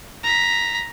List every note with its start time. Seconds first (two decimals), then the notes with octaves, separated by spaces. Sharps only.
0.24 A#5 B6